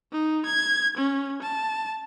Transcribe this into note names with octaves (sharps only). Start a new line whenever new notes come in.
D#4
G#6
C#4
A5